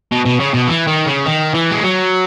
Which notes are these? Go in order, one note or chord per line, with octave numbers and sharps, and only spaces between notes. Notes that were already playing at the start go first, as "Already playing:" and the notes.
B2
B2
C#3
B2
E3
D#3
C#3
D#3
E3
G#3
F#3